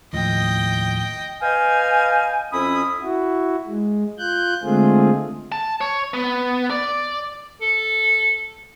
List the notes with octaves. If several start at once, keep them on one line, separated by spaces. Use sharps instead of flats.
D#2 A2 F3 D#5 G5
B4 D#5 F5 G5 G#5
F2 C#4 E4 B5 D#6
E4 F#4
G#3
F4 F#6 G6
D3 G#3 A3 C4 F4 G#4
A5
C#5
B3
D5
A4